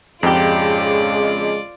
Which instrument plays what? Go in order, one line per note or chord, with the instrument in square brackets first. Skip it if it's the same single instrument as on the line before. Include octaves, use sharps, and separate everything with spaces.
[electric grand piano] F2 [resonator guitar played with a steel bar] G#2 G4 [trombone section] C#3 G#3 [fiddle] F4 D5